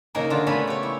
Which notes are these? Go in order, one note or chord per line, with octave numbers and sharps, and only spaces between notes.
C#3 A#3 D#4 G#4 A#4
D3 F4
C#3 A3 B3 G#5 B5
G4 C#5
E4